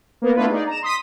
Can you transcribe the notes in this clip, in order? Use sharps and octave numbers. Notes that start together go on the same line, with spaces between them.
A#3 B3 A#4
A3 B3 D4 E4 F4 B4
D#4 G#4 D5
A#5 E7
C6 D#6 B6